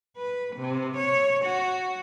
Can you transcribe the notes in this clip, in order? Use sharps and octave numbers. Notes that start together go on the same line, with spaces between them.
B4
C3
C#5
F#4